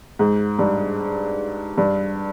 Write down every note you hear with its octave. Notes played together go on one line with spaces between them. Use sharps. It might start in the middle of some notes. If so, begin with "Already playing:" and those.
G#2
G2
G2